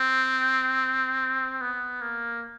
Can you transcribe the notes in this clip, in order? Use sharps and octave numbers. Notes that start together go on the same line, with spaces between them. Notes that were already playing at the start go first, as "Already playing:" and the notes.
Already playing: C4
B3
A#3